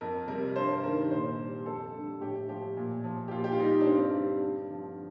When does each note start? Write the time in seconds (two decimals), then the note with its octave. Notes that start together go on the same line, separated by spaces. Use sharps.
0.01 F2 A#4
0.28 C3 G3 A#4
0.56 G2 C5
0.83 D#3 G3 A#4
1.11 A#2 C5
1.38 G3
1.66 F2 A4
1.94 D3 G3
2.21 A2 G4
2.49 F3 G4
2.77 A#2
3.04 F3
3.28 G4
3.31 A#2 F4
3.44 G4
3.52 F4
3.59 G3 D#4
3.81 D4
3.87 G2 C4
4.15 D3 G3
4.41 G2
4.70 D3 F3